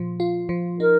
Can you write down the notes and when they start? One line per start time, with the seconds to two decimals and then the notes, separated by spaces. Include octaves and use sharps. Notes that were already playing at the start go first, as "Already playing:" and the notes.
Already playing: A#2 F3
0.20 F4
0.49 F3
0.80 D#4 A#4